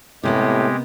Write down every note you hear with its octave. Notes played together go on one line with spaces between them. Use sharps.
A2 C3 G#3 A#3 B3 G4